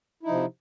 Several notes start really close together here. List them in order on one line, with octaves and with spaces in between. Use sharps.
E4 D#4 F3 C3